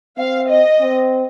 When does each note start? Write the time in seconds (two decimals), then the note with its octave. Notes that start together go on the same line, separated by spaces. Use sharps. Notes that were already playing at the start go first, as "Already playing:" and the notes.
0.18 C4 F5
0.49 D#5
0.81 C4